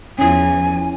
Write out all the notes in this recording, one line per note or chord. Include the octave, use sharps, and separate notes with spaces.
E2 E3 F3 C#4 E4 G#5